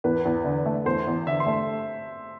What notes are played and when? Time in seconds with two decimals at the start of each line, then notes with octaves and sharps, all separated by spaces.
0.04 E2 B4
0.25 E2
0.45 D3
0.66 A3
0.85 E2 C5
1.07 E2
1.26 D3 E5
1.40 C6
1.46 A3